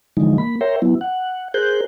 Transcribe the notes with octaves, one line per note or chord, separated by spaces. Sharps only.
D3 E3 F3 G#3 D#4
A#3 B5
A#4 C#5 E5 G5 A#5 C6
F#3 B3 E4
F#5
G#4 A#4 C5 F#6 G6